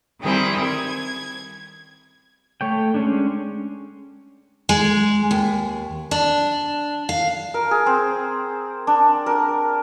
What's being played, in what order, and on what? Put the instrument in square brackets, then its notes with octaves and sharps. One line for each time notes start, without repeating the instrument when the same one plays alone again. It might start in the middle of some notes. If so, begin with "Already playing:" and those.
[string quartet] D#3 G3 C4 E4 G4 G#4
G#6
[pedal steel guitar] A3 C#5 G5
G#3 C#4 D4
[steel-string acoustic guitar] G#3
D#2
D4
F5
[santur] A#4
G#4
C4
D4
A#4